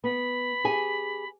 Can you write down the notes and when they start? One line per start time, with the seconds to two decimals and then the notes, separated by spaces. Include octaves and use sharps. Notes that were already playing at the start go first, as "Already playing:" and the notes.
0.04 B3 B5
0.64 G4 G#4 G#5